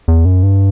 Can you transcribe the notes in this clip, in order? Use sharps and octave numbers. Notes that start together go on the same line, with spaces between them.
E2
F#2
G2